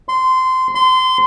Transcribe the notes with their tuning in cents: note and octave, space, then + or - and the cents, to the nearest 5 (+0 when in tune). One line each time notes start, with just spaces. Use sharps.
C6 -20
C6 -25